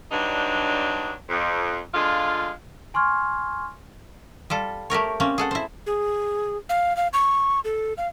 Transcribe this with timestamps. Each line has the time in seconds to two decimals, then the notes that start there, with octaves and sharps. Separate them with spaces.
0.11 G2 F#3 D4 D#4
1.29 F2
1.93 D3 G#3 F4
2.94 G#5 C6 C#6 F6 G#6
4.50 G3 F4 A4
4.90 A3 G4 A#4 C#5
5.20 A#3 C4 C#4
5.38 G#4 A4 F#5
5.51 E4 C5
5.86 G#4
6.69 F5
6.97 F5
7.13 C#6
7.64 A4
7.97 F5